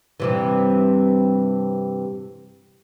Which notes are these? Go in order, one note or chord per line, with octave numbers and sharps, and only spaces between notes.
G2 C3 E3